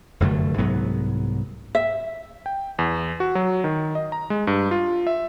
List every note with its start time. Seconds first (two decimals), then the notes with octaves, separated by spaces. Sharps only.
0.20 F1 F#2 D3 A3
0.58 C2 G#2 F#3 B3
1.75 E5
2.46 G5
2.79 E2
3.20 F#4
3.35 F#3
3.64 D#3
3.95 D#5
4.12 A#5
4.30 G#3
4.47 G2
4.71 F4
5.07 E5